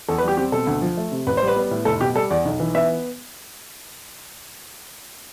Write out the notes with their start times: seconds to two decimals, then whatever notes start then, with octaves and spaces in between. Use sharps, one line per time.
0.08 E2 A4
0.18 B4
0.23 G3 G4
0.37 C4 G4
0.52 B2 A4
0.67 D2
0.82 F3
0.97 A3
1.12 C3
1.27 A1 B4
1.37 G3 C5
1.47 B4
1.56 B3
1.71 A2
1.85 F1 A4
2.01 B2 G4
2.15 G3 A4
2.30 E2 D5
2.45 B1
2.60 E3
2.75 B3 E5